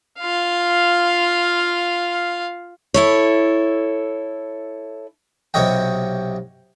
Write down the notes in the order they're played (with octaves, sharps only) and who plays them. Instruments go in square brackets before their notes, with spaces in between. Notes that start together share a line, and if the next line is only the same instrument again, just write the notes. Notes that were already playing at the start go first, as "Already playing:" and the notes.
[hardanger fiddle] F4 F5
[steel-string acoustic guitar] E4 A4 C#5
[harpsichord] B1 C3 G4 C#5 D#5 G5